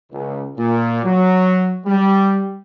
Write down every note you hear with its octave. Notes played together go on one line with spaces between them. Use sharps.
C#2
A#2
F#3
G3